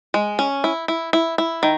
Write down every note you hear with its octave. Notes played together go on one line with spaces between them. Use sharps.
G#3
C#4
E4
E4
E4
E4
D#3